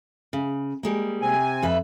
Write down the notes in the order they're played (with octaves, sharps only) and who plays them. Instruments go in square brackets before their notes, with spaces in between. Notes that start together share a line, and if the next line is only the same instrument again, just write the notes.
[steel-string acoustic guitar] C#3
G3 G#3 A#3
[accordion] C3 C4 G#5
[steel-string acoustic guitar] F2 B4 E5